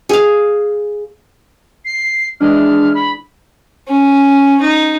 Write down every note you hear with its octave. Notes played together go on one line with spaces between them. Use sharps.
G#4 F5
C7
E3 G#3 D4 F6
B5
C#4
D#4